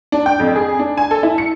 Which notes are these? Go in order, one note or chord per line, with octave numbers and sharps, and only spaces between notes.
D4
G5
F2
G#4
D4
G#5
A4
E4
C#7